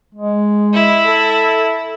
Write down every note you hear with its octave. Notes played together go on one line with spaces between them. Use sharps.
G#3
E4
A4